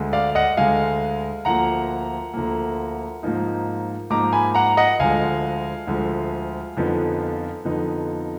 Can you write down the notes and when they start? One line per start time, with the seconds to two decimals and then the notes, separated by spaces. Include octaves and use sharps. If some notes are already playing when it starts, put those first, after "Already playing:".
Already playing: D2 D3 G#3
0.13 D5 F5
0.35 D#5 F#5
0.57 D2 D3 G#3 F5 G#5
1.45 D2 D3 F3 A#3 F#5 A#5
2.34 D2 D3 F3 A#3
3.23 G#2 F3 A#3 D#4
4.10 G#2 F3 A#3 D#4 A#5 D6
4.33 G#5 B5
4.55 F#5 A#5
4.77 D#5 F#5
4.99 D2 D3 F3 G#3 F5 G#5
5.87 D2 D3 F3 G#3
6.77 F2 D3 F3 B3 D#4
7.65 F2 D3 F3 B3 D#4